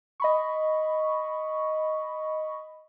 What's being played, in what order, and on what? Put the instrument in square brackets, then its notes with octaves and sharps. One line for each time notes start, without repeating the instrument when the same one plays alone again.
[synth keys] D#5 B5 C#6